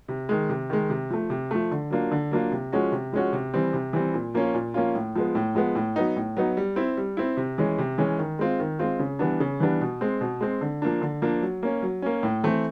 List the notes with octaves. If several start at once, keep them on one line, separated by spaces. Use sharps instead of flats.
C3
D#3 G#3
C3
D#3 G#3
C3
F3 A3
C3
F3 A3
D3
F#3 A#3 D4 F4
D3
F#3 A#3 D4 F4
C3
F3 G#3 C#4 F#4
C3
F3 G#3 C#4 F#4
C3
E3 G3 C4
C3
E3 G3 C4
A#2
F3 A#3 C#4 F4
A#2
F3 A#3 C#4 F4
A2
F3 G#3 B3
A2
F3 G#3 B3
A2
F#3 B3 D#4
A2
F#3 B3 D#4
G3
C4 E4
G3
C4 E4
C3
E3 G#3 C#4
C3
E3 G#3 C#4
D#3
G#3 C4 F4
D#3
G#3 C4 F4
C#3
E3 G3 B3 D4
C#3
E3 G3 B3 D4
B2
G#3 C4
B2
G#3 C4
D3
F3 A#3 D4
D3
F3 A#3 D4
F#3
A#3 C#4
F#3
A#3 C#4
A2
E3 A3 C4